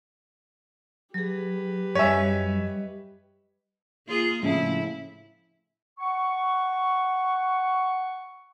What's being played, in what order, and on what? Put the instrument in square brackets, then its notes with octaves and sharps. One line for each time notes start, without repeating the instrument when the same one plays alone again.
[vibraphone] F#3 G#4 [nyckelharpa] G4 B4
[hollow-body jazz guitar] F#2 G#5 [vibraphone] G3 D#5 [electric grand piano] C#5 E5
[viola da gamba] A#3 F4 G#4
[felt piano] A2 C#3 F3 [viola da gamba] E4
[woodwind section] F#5 C#6